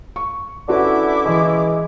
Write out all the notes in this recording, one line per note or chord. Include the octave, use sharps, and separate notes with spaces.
C#6
D3 C#4 E4 F#4 B4 D6
E3 G#3